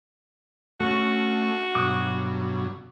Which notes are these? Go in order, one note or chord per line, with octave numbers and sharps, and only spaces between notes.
A3 C#4 F#4 A4
G2 B2 F#3 D6 D#6 F#6